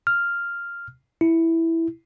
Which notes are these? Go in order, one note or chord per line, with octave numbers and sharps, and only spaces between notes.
F6
E4